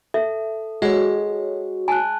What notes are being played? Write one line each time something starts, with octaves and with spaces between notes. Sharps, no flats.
A4 E5
G#3 F#4 C#5
G#5 A5 F#6